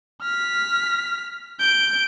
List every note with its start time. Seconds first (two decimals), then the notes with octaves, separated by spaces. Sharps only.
0.22 F6 B6
1.60 G6 D7